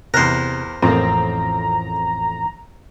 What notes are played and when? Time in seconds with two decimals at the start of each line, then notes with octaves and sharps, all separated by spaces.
0.14 E2 C3 A#4 C5 F#6
0.82 A1 F2 A2 A#3 C4 A#5